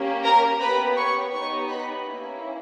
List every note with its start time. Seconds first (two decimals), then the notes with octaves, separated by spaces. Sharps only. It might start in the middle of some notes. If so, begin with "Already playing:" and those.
Already playing: A#3 C#4 G4
0.24 A#4 A#5
0.60 B3 G4 B4 B5
0.97 C#5 C#6
1.33 B3 D#4 G4 C#5 C#6
1.69 B4 B5
2.06 A#3 C#4 E4